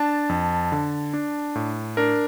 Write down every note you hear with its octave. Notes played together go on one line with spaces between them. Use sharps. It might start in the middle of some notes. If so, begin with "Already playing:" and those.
Already playing: D4 A5
F2
D3
D4
A2
D4 A#4